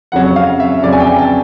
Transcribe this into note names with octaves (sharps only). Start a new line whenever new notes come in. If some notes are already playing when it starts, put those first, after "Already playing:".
F2 C#3 F#3 F#5
F5
E5
F2 C#3 F#3 D5
G#5
G5
A5